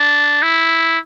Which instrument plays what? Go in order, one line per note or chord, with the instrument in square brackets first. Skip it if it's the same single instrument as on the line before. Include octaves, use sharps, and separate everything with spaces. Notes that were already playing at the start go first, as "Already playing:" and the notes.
Already playing: [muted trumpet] D4
E4